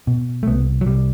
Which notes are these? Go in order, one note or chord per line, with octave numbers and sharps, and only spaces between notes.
B2
A3
C2 B3
F#3
C2 G3